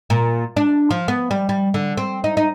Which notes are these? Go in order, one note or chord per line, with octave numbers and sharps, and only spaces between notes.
A#2
D4
F3
B3
G3
G3
D3
C4
D#4
D#4